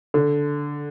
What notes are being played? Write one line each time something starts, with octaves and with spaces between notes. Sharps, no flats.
D3